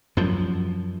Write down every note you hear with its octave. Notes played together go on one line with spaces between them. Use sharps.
F#2 F3